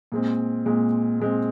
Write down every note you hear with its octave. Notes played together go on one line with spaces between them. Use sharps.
A#2 G#3 C4
A#2 G#3 C4
A#2 G#3 C4